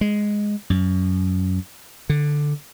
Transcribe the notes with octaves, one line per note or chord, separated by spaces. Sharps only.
G#3
F#2
D3